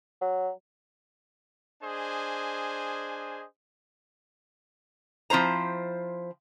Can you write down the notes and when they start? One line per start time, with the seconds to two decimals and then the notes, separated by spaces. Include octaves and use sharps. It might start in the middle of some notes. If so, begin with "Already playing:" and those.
0.21 F#3
1.83 D4 G#4 C5 D#5 G#5
5.30 F3 C4 E4 C5 A#5